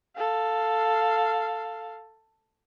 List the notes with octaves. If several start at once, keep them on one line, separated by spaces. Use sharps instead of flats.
A4 F5